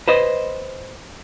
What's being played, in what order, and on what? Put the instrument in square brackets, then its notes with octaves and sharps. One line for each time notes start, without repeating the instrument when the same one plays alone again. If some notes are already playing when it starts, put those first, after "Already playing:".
[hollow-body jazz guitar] B4 C5 D#5